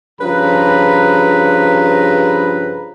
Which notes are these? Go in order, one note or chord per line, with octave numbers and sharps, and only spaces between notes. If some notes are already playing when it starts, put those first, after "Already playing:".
G2 C#3 F3 B4 A#5 B5